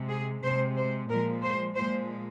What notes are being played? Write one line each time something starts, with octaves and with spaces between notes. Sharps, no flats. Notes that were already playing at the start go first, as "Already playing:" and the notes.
Already playing: C3 G#3
G#4
C3 G#3 C5
C5
A#2 F3 G#3 A#4
C5
A#2 F3 G#3 C5